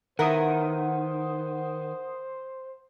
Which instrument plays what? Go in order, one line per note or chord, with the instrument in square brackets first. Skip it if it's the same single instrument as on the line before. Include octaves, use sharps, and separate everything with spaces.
[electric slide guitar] D#3 [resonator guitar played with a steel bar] B3 E4 A#4 [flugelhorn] C5 [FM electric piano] F#5 D#6